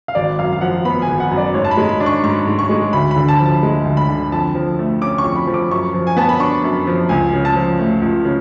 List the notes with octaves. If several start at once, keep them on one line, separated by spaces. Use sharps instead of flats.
F5
G#1 D5
F#2 F5
F5
F3 F#5
B3 B5
G#5
G#1
F#5
F#2
D5
G#2 C#5
A5
B5
G#3
B5
D4
C#6
G#2 C#6
G#2
C#6
G#3
D2 B5
B5
D3
A5
F3
A5
G#3
D2
B5
D3
F2 A5
F3
A3
C#4 D6
C#6
F2
B5
F3
D6
F#2 C#6
F3
G#5
B3 A5
B5
D4 C#6
F#2
F3
C#2 G#5
C#3
A5
F3
A3
C#2
C#3